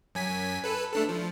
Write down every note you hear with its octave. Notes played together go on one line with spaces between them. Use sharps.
F#2 G#5 B6
A4 B4
A3 D4 A4
F3